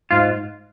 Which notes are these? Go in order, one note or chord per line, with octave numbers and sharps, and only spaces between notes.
G#2 F4